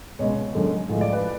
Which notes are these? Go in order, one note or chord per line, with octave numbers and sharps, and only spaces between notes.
C#2 B2 G#3 C#5
F#2 D3 G#3
A2 F3 G#3
D5
B4